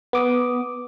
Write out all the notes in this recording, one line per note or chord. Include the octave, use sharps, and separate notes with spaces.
B3 D6 D#6